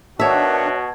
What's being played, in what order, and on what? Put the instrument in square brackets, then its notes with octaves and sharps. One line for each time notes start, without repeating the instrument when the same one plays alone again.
[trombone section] B2 F#4 [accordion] D#3 D4 [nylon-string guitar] C#5 E5 [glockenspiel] A5 G#6